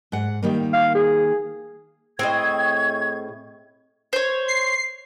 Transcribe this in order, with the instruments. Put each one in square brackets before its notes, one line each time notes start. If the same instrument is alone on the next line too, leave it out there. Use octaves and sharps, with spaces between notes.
[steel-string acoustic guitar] G#2 F#5
D#3 G3 A#3
[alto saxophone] F5
G#4
[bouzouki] A2 G#4 D#5 [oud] C4 [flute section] C#6 G#6
[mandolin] C5 C#5
[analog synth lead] C7